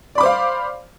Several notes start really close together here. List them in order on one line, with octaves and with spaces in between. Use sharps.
D5 B5 D6 C5 F5